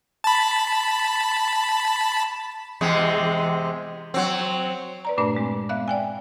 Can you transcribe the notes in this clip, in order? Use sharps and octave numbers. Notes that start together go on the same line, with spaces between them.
A5 B5
E2 C3 G#3
F#3 C4
B4 D5 A#5
G2 A#2 A3 D4 B4 D5
G#3 C4
B3 E5 F5 F#6
D5 G5 G#5